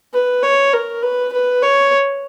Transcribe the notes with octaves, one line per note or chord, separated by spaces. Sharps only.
B4
C#5
A#4
B4
B4
C#5